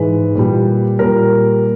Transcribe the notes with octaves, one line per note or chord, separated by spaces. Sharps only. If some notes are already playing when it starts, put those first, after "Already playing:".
Already playing: G#2 E3 G#3 B4
A#2 G3
A#2 G3 A#4